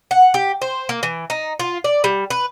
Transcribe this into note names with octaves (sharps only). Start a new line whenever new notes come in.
F#5
G4
C5
A#3
E3
D#4
F4
D5
G3
B4